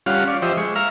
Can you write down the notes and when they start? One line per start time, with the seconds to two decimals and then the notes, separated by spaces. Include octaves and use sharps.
0.06 G3 C#4 F4 F5 F#5
0.28 D5 F5 C#6
0.42 F3 G4 C5 D#5 E5
0.57 G#3 C#6
0.76 E5 F5 A#5 F6